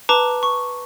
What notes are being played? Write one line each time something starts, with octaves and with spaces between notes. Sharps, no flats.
B4 A5 A#5 D6
C#6